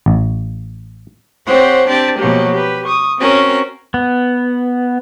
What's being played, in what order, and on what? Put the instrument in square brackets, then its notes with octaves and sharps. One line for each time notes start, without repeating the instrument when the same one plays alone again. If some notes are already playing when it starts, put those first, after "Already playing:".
[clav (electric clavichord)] A1
[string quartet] C4 G4 C5 C#5 F#5
C4 D4 G4 D5 A5
B2 F3 F#3 G#3 A#3 G4
G4 B4
C#6 D#6
C4 C#4 F#4 A#4
[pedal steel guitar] B3